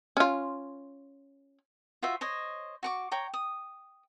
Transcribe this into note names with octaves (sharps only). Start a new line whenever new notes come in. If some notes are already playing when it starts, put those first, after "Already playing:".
C#4 F4
F4 F#4 C5 E5
C5 C#5 D#5
F#4 C#6 D6
C#5 G5 A#5
D#6